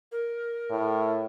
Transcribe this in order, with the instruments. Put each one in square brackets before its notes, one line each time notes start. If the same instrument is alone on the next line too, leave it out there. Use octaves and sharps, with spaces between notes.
[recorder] A#4
[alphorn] A2